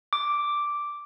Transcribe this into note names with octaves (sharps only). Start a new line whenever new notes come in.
D6